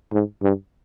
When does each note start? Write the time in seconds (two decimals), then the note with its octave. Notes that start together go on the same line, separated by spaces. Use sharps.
0.13 G#2
0.42 G2